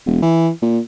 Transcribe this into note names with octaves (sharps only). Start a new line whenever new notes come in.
E1
E3
A#2